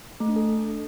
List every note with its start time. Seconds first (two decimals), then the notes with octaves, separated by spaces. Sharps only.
0.20 A3
0.28 D4
0.36 A4